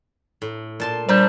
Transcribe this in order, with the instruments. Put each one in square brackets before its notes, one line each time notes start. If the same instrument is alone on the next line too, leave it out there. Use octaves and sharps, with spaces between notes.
[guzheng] A2
A#2 A5 C6
[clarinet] G3 [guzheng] D4 F4 E5 [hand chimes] C5 A#5 G6